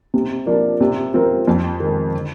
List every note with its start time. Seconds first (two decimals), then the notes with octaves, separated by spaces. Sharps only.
0.14 C3
0.46 F3 A#3 D4
0.81 C3
1.14 F3 C4 F4 A#4
1.48 F2
1.80 D#3 G#3
2.13 D3